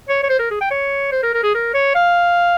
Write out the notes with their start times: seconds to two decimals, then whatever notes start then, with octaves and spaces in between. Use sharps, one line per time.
0.09 C#5
0.23 C#5
0.29 C5
0.39 A#4
0.51 G#4
0.61 G5
0.71 C#5
1.12 C5
1.23 A#4
1.34 A#4
1.43 G#4
1.55 A#4
1.74 C#5
1.95 F5